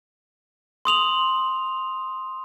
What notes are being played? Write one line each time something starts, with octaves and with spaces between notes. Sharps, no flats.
C6 D#6 F7 F#7